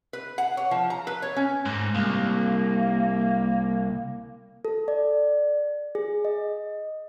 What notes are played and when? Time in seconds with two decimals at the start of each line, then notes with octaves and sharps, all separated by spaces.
0.13 B4
0.38 F#5
0.57 C#5
0.71 F3
0.90 A#5
1.07 B4
1.22 C#5
1.36 C#4
1.66 G#2
1.95 C2 A#3
4.65 A4
4.88 D5
5.95 G#4
6.25 D#5